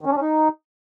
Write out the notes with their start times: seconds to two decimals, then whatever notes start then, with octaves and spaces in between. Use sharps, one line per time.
0.01 D#3
0.06 C#4
0.11 D4
0.16 C#4
0.21 D#4